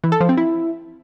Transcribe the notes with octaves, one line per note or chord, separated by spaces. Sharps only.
E3
A4
F3
C4
E4